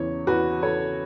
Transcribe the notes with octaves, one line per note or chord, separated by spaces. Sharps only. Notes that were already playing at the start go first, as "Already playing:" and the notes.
Already playing: E2 C#3 C#5
E2 F#4 B4
E2 A4 C#5